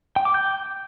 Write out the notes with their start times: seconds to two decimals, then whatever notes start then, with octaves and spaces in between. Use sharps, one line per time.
0.16 G5
0.25 D6
0.34 G6